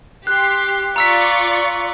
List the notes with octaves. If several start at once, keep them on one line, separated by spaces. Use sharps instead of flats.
G4 C6 F#6 C7
F4 D5 A#5 C#6 E6 B6